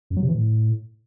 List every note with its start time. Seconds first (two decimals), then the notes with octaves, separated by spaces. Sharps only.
0.10 F#2
0.16 F#3
0.22 C3
0.28 E3
0.35 A2